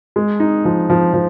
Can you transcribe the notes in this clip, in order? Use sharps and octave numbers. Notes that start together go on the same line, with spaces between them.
G#3
D#4
F3
F3
F3